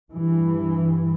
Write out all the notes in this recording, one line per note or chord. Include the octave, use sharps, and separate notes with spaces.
G2 E3